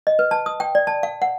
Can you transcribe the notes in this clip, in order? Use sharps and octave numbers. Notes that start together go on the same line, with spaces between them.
D#5
B4
A5
D#6
G5
D5
A5
F5
F#5